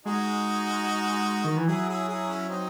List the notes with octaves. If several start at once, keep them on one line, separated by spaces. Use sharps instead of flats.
G#3 D#4 F#4
D#3
E3
F#3 E4 G#4
E4 G#4
E4 G#4
C#4 E4
C4 D#4